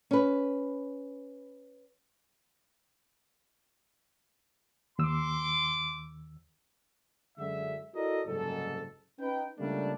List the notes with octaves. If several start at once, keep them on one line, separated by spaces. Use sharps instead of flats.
C#4 B4
D#2 C6 D6 E6
F#2 D3 G#3 E5
E4 F#4 A4 A#4 D5 D#5
F#1 C2 G#2 A4
C#4 D#4 B4 G5
C#2 C#3 G3 A3 A#3 D4